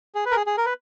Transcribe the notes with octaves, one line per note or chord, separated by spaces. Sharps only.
G#4
B4
A#4
G#4
G#4
A#4
B4